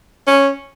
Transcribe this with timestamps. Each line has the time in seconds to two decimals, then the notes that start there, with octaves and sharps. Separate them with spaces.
0.27 C#4